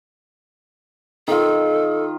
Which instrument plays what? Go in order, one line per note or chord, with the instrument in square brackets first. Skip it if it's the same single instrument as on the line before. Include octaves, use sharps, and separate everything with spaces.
[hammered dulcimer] D#3 F4 [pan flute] A4